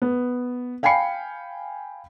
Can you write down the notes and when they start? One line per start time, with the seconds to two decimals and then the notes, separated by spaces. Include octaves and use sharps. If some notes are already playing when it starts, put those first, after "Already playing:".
0.02 B3
0.83 F5 G5 G#5 B5 C7 C#7